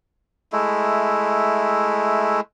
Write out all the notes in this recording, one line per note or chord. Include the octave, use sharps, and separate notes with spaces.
G#3 A3 E4